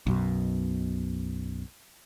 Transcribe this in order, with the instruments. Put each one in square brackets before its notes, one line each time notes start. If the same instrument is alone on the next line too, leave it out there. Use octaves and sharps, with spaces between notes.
[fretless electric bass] B1 F#2 B2